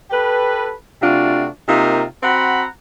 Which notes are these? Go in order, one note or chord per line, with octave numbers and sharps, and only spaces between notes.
G4 A4 B4
C3 A3 D4 F4 F#4
C3 A#3 D#4 F4 A#4
C4 F#4 F#5 A#5 B5